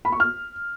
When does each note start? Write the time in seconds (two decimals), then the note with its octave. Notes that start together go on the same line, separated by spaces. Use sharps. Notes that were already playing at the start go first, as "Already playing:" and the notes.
0.05 B5
0.12 C#6
0.20 F6